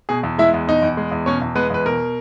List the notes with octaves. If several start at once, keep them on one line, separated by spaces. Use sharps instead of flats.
B2 G#4
E2
G#3 E4 E5
E2
B2 D#4 D#5
E2
G#3
E2
B2 C#4 C#5
E2
G#3 B3 B4
E2 B4
B2 A#4